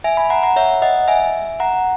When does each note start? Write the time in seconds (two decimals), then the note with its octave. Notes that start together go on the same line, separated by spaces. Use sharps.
0.04 E5 G#5
0.17 G#5 B5
0.30 F#5 A#5
0.43 F#5 A#5
0.56 C#5 E5
0.82 D#5 F#5
1.08 E5 G#5
1.60 F#5 A#5